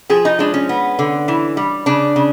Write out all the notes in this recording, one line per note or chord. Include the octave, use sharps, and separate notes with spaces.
F3 G#4
D#4
G#3 D4
C#4
B3
D3
E3
G3
C#3 D4
C#3